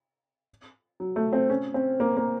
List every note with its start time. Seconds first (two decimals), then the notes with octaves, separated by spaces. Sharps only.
1.00 F#3
1.16 A3
1.33 C4
1.50 C#4
1.74 C4
2.00 A#3
2.17 A#3